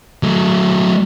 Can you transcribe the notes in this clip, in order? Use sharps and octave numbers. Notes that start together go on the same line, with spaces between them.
F#3 A3